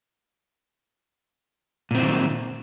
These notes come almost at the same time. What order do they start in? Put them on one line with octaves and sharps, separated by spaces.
A#2 C4 E3 D#3